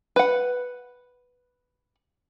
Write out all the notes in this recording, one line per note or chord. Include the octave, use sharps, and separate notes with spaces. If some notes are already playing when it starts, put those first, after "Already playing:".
B4 F#5